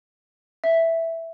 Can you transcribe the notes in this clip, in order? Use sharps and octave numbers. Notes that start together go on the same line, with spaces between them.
E5